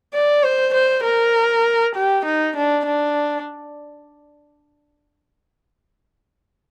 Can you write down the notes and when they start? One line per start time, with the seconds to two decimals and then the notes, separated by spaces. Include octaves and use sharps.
0.13 D5
0.43 C5
0.74 C5
1.04 A#4
1.95 G4
2.25 D#4
2.56 D4
2.86 D4